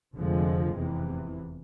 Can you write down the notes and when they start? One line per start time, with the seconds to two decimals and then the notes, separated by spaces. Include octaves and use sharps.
0.16 F1 F2 D3 F3 G#3
0.75 F1 E2 C3 E3